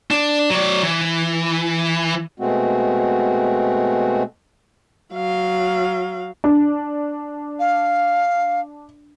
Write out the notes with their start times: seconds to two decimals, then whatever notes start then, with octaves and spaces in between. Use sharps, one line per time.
0.11 D4
0.50 F#3 D5
0.83 E3
2.40 B2 G#3 A3 C4 F#4
5.13 F#3 F5
6.44 D4
7.60 F5